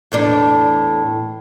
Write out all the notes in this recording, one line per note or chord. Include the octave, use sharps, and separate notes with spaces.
E2 A2 D4